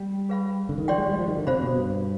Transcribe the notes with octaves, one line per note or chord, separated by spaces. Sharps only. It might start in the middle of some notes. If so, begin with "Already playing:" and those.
Already playing: G3
G#4 B4 F5 B5
D3
D#3
F3 G4 D5 G5 C6
G#3
G3
F3
D#3
D3
C3 C5 F5 B5
B2
G2